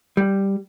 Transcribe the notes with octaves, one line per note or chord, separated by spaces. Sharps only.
G3